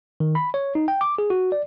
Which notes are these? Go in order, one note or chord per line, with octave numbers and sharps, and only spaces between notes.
D#3
B5
C#5
D#4
G5
D6
G#4
F#4
D5